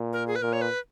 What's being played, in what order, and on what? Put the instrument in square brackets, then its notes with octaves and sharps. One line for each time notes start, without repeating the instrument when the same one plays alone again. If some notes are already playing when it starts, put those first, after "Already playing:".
Already playing: [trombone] A#2
[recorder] A#4
G#4
B4
[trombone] A#2 [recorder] A#4
[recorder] C#5
B4